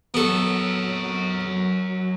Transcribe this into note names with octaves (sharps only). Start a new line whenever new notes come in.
F#3 B3 A4 A#4 C#5